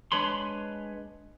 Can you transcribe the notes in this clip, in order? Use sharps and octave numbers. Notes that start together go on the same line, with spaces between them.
G#3 D4 B4 C#5 B5 C6